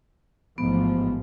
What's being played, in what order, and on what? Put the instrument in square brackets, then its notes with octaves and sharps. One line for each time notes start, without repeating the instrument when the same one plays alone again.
[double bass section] A1 G#2 F3 [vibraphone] B3